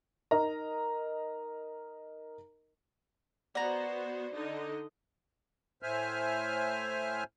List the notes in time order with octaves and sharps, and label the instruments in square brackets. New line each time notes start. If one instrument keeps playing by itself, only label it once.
[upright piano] D#4 A#4 D#5 A#5
[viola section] B3 F#4 C5 [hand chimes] D5 [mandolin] F#5 A#5
[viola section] D3 D#4 D#5
[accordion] A2 C5 E5 G#5 F6